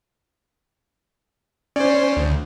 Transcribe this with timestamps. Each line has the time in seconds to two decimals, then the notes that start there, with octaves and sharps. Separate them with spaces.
1.76 C#4 C5 D5
2.17 D2